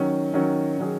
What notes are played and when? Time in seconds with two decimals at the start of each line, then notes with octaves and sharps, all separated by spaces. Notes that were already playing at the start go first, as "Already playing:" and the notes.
Already playing: D#3 F#3 C#4
0.34 D#3 F#3 C#4
0.78 D#3 F#3 C#4 G#4